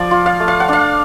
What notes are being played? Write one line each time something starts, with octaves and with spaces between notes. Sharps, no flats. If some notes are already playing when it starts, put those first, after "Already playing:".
Already playing: F3 D5
F4
F5
A3
F5
F#5
D4 F5